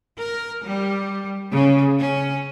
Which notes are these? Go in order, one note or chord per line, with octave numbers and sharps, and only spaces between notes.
A#4
G3
C#3
C#4